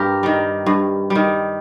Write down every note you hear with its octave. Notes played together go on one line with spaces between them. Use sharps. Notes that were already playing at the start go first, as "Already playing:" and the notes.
Already playing: G2 G4 A#4
D#3 G3
G2
G3
D#3